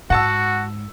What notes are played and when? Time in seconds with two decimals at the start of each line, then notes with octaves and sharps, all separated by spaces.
0.10 G#2 F#4 F#5 A5 E6